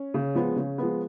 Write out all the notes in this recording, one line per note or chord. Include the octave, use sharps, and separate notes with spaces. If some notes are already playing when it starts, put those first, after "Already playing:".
Already playing: C#4
C#3
F3 G#3 B3
C#3
F3 G#3 B3